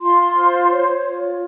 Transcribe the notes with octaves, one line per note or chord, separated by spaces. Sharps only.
F4 C6
C5
C#5
F4